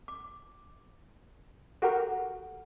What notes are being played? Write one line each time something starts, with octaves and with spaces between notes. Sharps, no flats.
D6
F#4 G4 A4 A#4 F#5